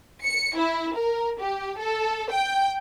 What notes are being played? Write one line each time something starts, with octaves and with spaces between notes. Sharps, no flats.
C#7
E4
A#4
G4
A4
G5